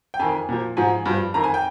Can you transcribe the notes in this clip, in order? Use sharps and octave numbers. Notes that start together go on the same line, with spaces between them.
G5
F2 D#3 G#5
A#2 F3
G#2 F3 G#5
G2 F3
F2 D#3 A#5
G#5
G5